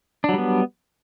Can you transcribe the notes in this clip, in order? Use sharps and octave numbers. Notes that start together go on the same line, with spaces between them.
F#3 G3 B3 D4